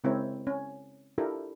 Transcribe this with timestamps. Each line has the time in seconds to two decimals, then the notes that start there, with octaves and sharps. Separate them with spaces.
0.04 C#3 G#3 C4 E4 A#4 C#5
0.47 C#4
1.18 D4 E4 F4 G4 A4 A#4